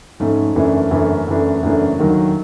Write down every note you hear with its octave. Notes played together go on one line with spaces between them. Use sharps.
G#2 F3 A3 C#4
F#2 C#3 E3 A3 D4
F#2 C#3 E3 A3 D4
F#2 C#3 E3 A3 D4
F#2 C#3 E3 A3 D4
D#2 D#3 F#3